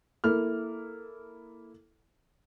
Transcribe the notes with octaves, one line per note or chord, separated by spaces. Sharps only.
A#3 E4 A4 F6